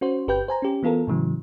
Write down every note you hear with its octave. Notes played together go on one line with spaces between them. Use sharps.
C#4 F#4 C5
G1 G4 B4 G5 G6
C5 G#5 A#5
C#4 G4
E3 B3 F4 A4 A#4
A2 C#3 E3 F#3